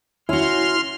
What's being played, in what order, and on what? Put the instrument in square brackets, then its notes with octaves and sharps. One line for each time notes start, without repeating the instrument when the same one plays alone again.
[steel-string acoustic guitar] C#4 F#4 [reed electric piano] E4 [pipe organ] C6 F6